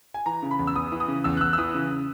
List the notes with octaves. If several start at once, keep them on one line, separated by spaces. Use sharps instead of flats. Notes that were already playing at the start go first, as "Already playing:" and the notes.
G#5
E3 A#5
C#3
B5
E2
E6
E2 D#6
E3
D#6
C#3
E2 E6
F#6
E2 E6
E6
E3 D#6
C#3